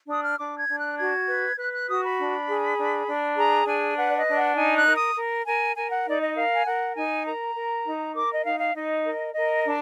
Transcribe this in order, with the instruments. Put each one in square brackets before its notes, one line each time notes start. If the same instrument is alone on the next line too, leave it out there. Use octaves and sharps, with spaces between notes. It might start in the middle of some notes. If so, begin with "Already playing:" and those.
[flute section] D4 D#6
F6
D4 D6
G#6
D4
F#6
F#4 G#6
B4
B4 F#6
F#6
F#4 D#6
B5
D4
G#4
D4
D4
G#4 A#5
D4 G#5
B4 F#5
D5
D#5
D4
F#5
D#4 G#5
F#6
A#4
D#6
A#4
A#4 G#5
A#4 G#5
F#5
D#4 D5
D#5
A#4 F5
G#5
A#4 F#5
D#4 G#5
A#4 A#5
A#4
D#4
A#4 D6
D#5
D#4 F5
F5
D#4 D#5
A#4
A#4 D#5
D4